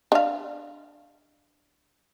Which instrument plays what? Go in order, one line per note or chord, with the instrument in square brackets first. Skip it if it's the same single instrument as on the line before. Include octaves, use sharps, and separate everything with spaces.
[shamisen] D4 F5